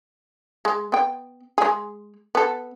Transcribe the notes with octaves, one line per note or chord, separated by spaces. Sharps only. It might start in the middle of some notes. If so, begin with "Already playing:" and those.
G#3
B3 G5
G#3 G#4
B3 A4